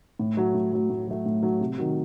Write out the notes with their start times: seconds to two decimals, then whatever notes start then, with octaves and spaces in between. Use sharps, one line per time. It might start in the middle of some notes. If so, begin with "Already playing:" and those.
0.19 A2
0.37 F#3 A3
0.55 A2
0.72 F#3 A3
0.90 A2
1.07 F#3 A3
1.26 A2
1.43 F#3 A3
1.60 C3
1.78 D#3 F#3